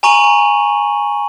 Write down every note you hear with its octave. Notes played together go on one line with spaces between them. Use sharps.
G#5 A#5 C#6 D#7 F#7